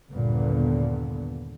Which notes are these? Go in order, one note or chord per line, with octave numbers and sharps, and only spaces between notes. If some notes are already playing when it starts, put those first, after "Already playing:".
G1 D#2 A#2 D3 B3